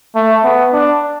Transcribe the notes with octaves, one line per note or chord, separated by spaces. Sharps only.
A3
B3
D4